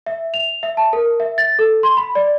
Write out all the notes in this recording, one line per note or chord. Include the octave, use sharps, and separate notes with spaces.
E5
F7
E5
A5
A#4
E5
A6
A4
C6
B5
D5